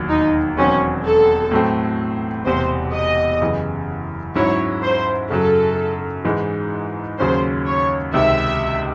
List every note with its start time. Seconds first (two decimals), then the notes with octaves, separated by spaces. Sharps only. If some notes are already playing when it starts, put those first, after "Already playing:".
Already playing: E1 D#2 D#3 F#3
0.09 D#4
0.57 E1 E2 D#3 F#3 C4 C#4
1.04 A4
1.51 A2 F#3 A3 C4
2.46 E1 E2 C3 C5
2.94 D#5
3.41 F#2 C#3 E3
4.36 G#2 F#3 C#4 E4 C#5
4.83 C5
5.30 F#2 C#3 F#3 A4
6.25 G#2 E3 G#3 D#4
7.19 D#2 C#3 F#3 C#4 C5
7.66 C#5
8.14 C#2 C3 D#3 E5